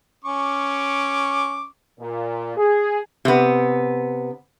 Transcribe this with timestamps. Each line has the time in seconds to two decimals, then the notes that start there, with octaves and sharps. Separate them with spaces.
0.25 C#4 C#6 D6
1.99 A#2
2.57 G#4
3.25 C3 B3